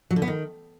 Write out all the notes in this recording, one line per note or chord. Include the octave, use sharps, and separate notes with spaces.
F#3
D3
B3
D#3